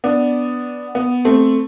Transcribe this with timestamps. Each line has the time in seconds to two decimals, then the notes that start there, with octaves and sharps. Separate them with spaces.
0.04 B3 D4
0.95 B3
1.25 A3 C4